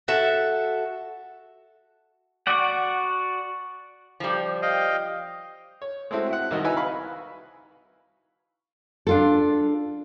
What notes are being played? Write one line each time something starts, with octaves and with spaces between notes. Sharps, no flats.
F#4 A4 E5
F#4 D5 F#5
F3 G3
D#5 F5 G5
C#5
G#3 A3 C4 E4 F#4
E4 F#5
C2 D#3 F#4 D#5 F#5
D#4 E4 B4 E5 G#5
F5 B5 C#6
D4 F4 A4